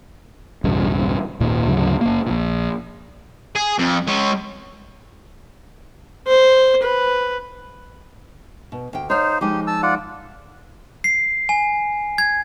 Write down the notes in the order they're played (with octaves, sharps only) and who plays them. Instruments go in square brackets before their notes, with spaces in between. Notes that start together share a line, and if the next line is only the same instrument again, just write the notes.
[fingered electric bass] B1 E2 G2 C#3
G#1 D#2 A#2 A#3
D2 G#2 C#3 F#3
F#1 A#3
A#1 A#2
[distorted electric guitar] G#4
F2
G#3 C#5
[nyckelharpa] C5
B4
[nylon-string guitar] B2
D2 G5
[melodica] D#4 C5 [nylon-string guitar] C#5 F5
[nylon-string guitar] F3 G#3 D#4 [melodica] G4
[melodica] A5 E6
F4 D5 F#5
[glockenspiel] C7
G#5
G#6